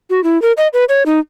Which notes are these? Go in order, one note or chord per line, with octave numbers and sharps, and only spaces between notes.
F#4
E4
A#4
D#5
B4
C#5
D#4